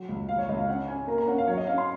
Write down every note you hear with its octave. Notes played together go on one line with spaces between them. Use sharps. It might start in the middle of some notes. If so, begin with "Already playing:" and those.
Already playing: F#3
C#2
C#2 F5
C#5
C#2 D#5
F5
C#4 F#5
C#4 G#5
A#3 A#5
A#5
C#4 F#5
F5
F#3 C#5
D#5
C#4 F5
C6